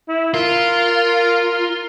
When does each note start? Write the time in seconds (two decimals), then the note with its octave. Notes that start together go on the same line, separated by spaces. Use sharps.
0.08 E4
0.34 F4 A#4